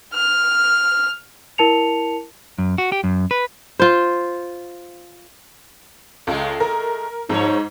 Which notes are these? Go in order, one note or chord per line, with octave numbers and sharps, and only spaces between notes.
F6
E4 A#4 A5 C#7 F7
F#2
F#4
G4
F#2
B4
F4 C5
C#2 G#3 A3 A4
A#4
F2 G#2 F3 D#4 C#5